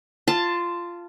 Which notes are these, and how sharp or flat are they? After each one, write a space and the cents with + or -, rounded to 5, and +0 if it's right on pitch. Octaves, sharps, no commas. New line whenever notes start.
F4 -10 A5 +10